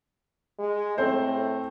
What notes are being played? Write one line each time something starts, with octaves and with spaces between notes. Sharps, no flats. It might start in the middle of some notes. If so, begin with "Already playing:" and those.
G#3
A2 C4 A4 C5